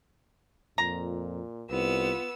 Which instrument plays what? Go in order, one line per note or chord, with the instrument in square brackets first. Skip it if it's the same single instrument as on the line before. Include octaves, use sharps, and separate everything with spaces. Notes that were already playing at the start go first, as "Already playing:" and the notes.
[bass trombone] F2 [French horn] A#2 [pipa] A#5
[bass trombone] C2 [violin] B3 E6 [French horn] F4